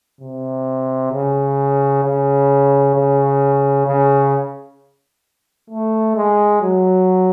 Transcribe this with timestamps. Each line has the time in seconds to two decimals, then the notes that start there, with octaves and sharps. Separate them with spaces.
0.21 C3
1.12 C#3
2.04 C#3
2.95 C#3
3.87 C#3
5.70 A3
6.16 G#3
6.62 F#3